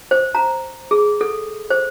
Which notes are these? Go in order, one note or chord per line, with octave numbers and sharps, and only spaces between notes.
C5
A#5
G#4
A4
C5